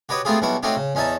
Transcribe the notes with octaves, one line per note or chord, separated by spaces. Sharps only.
F#4 G4 B4 C#5 D#5
A3 B3 C4 F4 G4 G#4
B1 B2 G3 E4 C#6
A3 C4 C#4 D#4 F#4 G4
C#3
E2 C#4 D#4 E5 A5